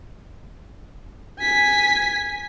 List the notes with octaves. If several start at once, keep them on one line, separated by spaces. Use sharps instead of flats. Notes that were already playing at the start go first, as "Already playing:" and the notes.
G#5 B6